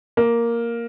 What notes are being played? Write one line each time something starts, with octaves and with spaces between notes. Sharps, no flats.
A#3